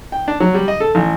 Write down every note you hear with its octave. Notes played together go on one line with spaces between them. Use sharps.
G5
D4
F#3
G3
D#5
A4
A1